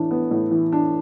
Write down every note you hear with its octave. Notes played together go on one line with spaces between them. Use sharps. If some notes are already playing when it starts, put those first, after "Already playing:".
Already playing: A2 E3 D4
B3
A2
E3
D4